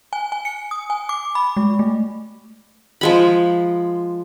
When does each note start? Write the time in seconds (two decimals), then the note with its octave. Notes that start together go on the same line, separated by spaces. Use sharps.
0.13 G#5
0.32 G#5
0.45 C#7
0.71 D#6
0.90 G#5
1.09 D6
1.35 B5
1.57 G#3
1.79 A3
3.01 F3 G#3 B5